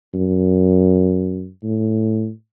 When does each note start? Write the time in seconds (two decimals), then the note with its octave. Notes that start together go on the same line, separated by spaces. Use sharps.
0.14 F#2
1.63 A2